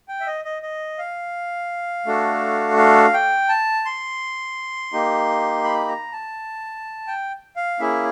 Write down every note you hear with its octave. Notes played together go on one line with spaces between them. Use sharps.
G5
E5
D#5
D#5
D#5
F5
A3 D4 F#4 A4
F5
G5
A5
C6
A#3 D#4 G4
B5
A#5
A5
G5
F5
A#3 C#4 E4 G#4 E5